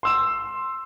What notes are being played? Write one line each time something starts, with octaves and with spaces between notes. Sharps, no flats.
C6 E6 E7